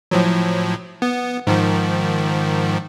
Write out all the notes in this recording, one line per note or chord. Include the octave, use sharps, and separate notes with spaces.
A2 F3 F#3
B3
G#2 D#3 F3